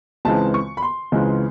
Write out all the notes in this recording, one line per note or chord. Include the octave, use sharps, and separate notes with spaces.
C#2 C#3 E3 G#3 C4 A5
C#6
B5
C6
C#2 C#3 E3 G#3 C4